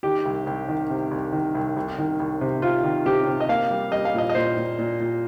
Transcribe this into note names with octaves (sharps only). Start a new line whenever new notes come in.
D#3 G4
C2
C2
D#3
C3
C2
D#3
C2
C2
D#3
C2
C3
C3 F4
D#3
C3 G4
C3
D#5
A#3 F5
G3
G3 D#5
F5
A#2 D#5
D#5
A#2 C5
A#2
A#2
A#2